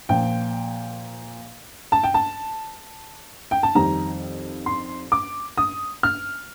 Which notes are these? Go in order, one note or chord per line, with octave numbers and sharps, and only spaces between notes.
A#2 F3 G5
A5
G5
A5
G5
A5
F2 D#3 G3 A#5
C6
D6
D#6
F6